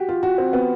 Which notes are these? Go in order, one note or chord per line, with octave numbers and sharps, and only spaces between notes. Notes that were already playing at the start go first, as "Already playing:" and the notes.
Already playing: F#4 G4
F4
F#4
C4
B3